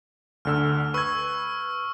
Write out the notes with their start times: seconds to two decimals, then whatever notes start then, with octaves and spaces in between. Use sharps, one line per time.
0.45 D2 D3 E6 F6
0.94 B4 C#6 E6 G#6